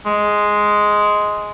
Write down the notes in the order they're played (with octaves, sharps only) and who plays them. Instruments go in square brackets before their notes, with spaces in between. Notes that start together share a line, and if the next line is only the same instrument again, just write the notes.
[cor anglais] G#3